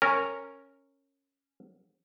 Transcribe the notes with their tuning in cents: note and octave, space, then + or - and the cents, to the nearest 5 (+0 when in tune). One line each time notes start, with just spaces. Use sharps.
C#4 -10 A#4 -10